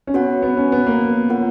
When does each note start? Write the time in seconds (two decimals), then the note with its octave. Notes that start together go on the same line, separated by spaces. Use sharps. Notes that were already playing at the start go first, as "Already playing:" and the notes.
0.07 C#4
0.14 B3 F#4 C#5 F#5
0.42 B3
0.57 C#4
0.72 B3
0.87 A#3
1.29 F4 A#4 C#5 F#5